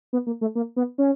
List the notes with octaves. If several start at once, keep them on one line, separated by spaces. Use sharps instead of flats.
B3
A#3
A3
A#3
B3
C#4